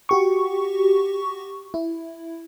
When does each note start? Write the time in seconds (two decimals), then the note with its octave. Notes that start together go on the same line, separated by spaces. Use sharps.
0.09 F#4 G4 C#6
1.74 E4